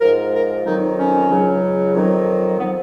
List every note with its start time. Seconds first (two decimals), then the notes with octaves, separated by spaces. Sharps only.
0.01 G#2 F3 A#4
0.34 A#4
0.65 F2 D#3 F#3 D#4
0.98 C#4
1.30 C#2 C#3 F#3
1.94 F2 D#3 F#3
2.59 F3 B3